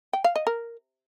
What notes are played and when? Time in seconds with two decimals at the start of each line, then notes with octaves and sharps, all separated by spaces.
0.13 G5
0.24 F5
0.36 D#5
0.47 A#4